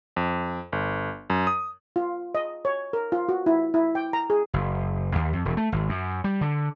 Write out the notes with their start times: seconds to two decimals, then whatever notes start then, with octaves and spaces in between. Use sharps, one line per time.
0.16 F2
0.72 G1
1.30 F#2
1.47 D#6
1.96 F4
2.35 D#5
2.65 C#5
2.93 A#4
3.12 F4
3.29 F#4
3.46 E4
3.74 E4
3.95 G5
4.13 A#5
4.30 G#4
4.53 F#1
5.15 D#2
5.33 F2
5.45 E1
5.57 A3
5.72 G#1
5.89 F#2
6.24 G3
6.41 D3